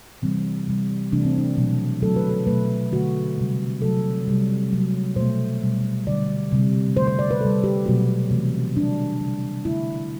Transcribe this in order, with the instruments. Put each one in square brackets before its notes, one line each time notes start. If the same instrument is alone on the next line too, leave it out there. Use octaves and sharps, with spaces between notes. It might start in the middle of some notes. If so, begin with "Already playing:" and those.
[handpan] C3 E3 G3 C4
C3 G3
C3 E3 A3 D4
C4
D4
B2 F#3 A3
D3 F#3 A3 A4
B4
A4
B2 F#3 A3 B4
D3 A3 F#4
C3 G3
C3 F#3 A3 A4
C3 G3
C3 F#3 A3
B2 A3 C5
B2 G3
D3 G3 D5
C3 G3
D3 A3 C5
C5
D5
B4
C3 G3 A4
G4
B2 F#3 A3 F#4
C3 E3 A3
D3 G3 D4
C3 G3
D3 A3 E4